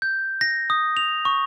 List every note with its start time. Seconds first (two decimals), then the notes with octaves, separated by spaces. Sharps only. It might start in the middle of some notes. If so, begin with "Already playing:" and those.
0.02 G6
0.41 A#6
0.70 D#6
0.97 F7
1.25 C#6